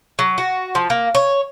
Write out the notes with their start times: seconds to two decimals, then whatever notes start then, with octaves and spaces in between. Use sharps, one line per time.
0.19 F#3
0.38 F#4
0.75 F3
0.90 A#3
1.15 C#5